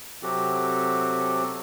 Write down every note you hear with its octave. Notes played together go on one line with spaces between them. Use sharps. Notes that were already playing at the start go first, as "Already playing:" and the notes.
C3 F#3 C4 F#4 G4 A4